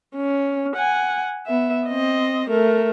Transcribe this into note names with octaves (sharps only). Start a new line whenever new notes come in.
C#4
F#5 G#5
B3 E5
C4 D#5
A3 A#4